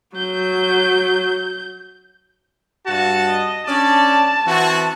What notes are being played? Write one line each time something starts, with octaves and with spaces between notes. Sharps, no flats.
F#3 G6
G2 F#4 A5
D#5
C#4 D4 D5 A5
E3 C4 F#4